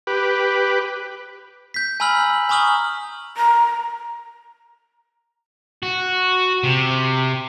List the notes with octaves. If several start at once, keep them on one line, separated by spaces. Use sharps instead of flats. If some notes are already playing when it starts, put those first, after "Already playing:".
G4 B4
G6 B6
G#5 A#5 B5 E6 F6 F#7
G#5 A#5 C#6 D#6 F6 F#7
A#5
F#4
C3